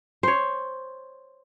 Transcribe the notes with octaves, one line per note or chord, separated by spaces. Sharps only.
C5 C#5